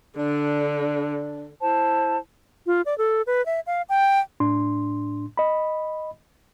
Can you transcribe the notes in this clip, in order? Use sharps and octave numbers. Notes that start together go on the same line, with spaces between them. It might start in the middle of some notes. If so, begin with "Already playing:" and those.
D3 D4
E4 C5 A5
F4
D5
A4
B4
E5
F5
G5
A2 D4 C6
D#5 B5